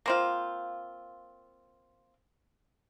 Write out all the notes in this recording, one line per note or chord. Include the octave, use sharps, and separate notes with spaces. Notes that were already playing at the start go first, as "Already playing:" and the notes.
A#3 C4 F4